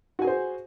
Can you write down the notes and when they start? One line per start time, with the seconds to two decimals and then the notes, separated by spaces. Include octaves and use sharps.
0.19 F#4
0.22 G#5
0.25 G#4
0.27 C5